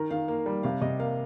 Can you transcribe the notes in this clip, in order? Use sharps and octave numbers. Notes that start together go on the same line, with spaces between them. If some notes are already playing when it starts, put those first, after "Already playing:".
Already playing: D#3 A#4 A#5
D#3 F5
A#3
G3
C3 F5
C3 D#5
A#3 F5